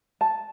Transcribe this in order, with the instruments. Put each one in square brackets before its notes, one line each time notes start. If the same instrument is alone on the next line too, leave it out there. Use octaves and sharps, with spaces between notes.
[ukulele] A5